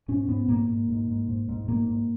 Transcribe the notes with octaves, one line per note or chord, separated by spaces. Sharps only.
G#2 C#4
G#2 B3
G#2 A#3
G#2
G#2
G#2
G#2
G#2
G#2 A#3
G#2